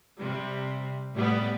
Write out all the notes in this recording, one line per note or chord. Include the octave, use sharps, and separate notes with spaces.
C3 G3
A2 G3 B3